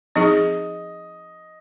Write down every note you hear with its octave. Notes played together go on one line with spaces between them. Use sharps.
F3 C4 D#4 G#4 D#5